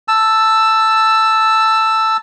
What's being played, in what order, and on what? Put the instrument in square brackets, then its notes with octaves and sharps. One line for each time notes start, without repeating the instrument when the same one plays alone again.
[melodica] A5 E6